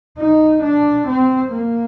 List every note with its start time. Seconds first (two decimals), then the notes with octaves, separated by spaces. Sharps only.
0.18 D#4
0.63 D4
1.08 C4
1.52 A#3